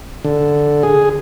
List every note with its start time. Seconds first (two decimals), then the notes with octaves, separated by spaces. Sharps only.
0.25 D3
0.83 G#4